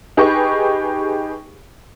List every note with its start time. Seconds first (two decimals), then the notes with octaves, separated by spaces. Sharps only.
0.17 D#4 G4 G#4 B4 C#6